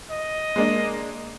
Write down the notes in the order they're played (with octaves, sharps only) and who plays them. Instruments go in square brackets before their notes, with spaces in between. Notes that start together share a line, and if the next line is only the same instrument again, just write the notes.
[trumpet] D#5
[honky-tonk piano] G#3 A#3 D4